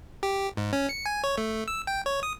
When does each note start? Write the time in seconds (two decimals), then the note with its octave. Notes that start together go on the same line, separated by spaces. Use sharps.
0.23 G4
0.57 G#2
0.73 C#4
0.89 C#7
1.06 G#5
1.24 C#5
1.38 A3
1.68 E6
1.87 G5
2.06 C#5
2.23 D#6